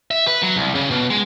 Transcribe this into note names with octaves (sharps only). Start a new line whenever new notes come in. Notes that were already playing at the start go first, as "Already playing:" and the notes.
E5
B4
F#3
C2
C#3
B2
G#3